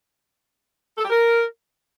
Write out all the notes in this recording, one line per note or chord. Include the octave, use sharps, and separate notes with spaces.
A4
G4
A#4